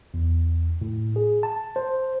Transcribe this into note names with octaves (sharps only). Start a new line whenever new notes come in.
E2
A2
G#4
A5
C5